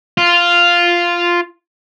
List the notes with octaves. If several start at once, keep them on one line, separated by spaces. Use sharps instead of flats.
F4